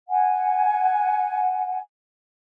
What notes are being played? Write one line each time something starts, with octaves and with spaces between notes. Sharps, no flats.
F#5 G#5